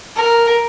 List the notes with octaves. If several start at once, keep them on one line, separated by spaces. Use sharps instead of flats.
A#4